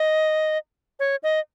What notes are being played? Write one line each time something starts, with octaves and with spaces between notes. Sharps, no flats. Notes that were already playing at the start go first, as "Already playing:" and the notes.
Already playing: D#5
C#5
D#5